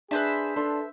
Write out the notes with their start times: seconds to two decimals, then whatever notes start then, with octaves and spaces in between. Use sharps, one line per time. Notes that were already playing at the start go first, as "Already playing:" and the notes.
0.11 D4 G#4 B4 C5 E5
0.56 D4 A4 C6